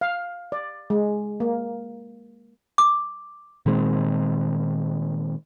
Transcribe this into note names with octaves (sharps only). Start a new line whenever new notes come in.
F5
D5
G#3
A#3
D6
A#2 D#3 G#3 C4